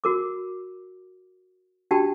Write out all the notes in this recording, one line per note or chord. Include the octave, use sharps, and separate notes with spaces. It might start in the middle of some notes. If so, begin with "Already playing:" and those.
F#4 A#4 D6
D4 F#4 G4 G5 A5